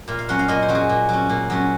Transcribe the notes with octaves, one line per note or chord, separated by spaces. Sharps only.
A#2 F5
F5
F#3 C#4 F#5
F5
A#2 D#5
C5
F#3 C#4
G#4
A#2
F#3 C#4
A#2
F#3 C#4